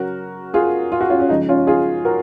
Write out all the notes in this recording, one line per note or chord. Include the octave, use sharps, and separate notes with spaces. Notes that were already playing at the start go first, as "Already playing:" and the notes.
Already playing: C#3 F#3 F#4 A#4
F4 G#4
F4
F#4
C#4 F4
C#4
C#3 F3 G#3 D#4
C#4 F4
F4 G#4
F#4 A#4